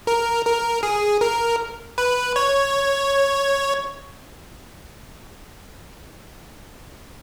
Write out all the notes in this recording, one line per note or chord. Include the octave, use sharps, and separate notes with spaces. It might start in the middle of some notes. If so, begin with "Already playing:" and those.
A#4
A#4
G#4
A#4
B4
C#5